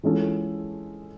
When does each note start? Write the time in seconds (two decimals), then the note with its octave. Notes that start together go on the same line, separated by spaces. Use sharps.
0.03 E3 G#3 C#4 F4 A4